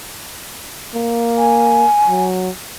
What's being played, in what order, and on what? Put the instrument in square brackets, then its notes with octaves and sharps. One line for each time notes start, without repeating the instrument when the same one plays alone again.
[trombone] A#3
[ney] G#5
[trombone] F#3